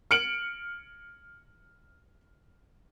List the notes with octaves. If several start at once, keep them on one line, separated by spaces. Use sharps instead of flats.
F6 C#7 D7 F#7